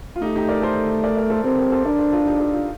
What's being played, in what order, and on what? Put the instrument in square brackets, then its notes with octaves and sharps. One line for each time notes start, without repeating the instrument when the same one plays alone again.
[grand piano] F4
[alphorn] A3 [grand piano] D#4 G4
[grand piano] D#4 G4
A#4 D5
A4 C5
A#4 D5
A#4 D5
A4 C5
[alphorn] C4 [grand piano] G4 A#4
[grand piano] G4 A#4
A4 C5
[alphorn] D4 [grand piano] A#4 D5
[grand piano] A4 C5
F4 A4
D#4 G4
F4 A4
F4